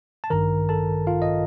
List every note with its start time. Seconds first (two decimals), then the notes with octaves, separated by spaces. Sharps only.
0.24 A5
0.30 A1 G2 D#3 A#4 A#5
0.69 A4 A5
1.07 F4 F5
1.22 D#5